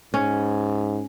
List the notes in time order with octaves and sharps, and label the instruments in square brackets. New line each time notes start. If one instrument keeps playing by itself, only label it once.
[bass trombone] G#2 [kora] C#4